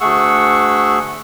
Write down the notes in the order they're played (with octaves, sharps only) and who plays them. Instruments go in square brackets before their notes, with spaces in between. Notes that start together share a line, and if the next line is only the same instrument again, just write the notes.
[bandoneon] D2 A3 G#4 F#5 C#6 E6